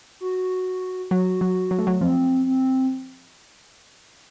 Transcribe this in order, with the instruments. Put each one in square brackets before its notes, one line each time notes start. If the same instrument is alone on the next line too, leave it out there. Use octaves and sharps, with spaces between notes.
[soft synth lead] F#4
[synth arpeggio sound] F#3 [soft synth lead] F#4
[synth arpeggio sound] F#3
F#3
A3
F#3
[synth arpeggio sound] F3 [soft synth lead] C4
[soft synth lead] C4